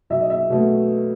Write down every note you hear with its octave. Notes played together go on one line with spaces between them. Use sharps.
B1 E5
D#5
E5
B2 A3